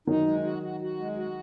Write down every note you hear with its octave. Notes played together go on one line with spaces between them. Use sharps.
D#3 F#3 D#4
G#3
F#4
F#4
F#4
G#3
F#4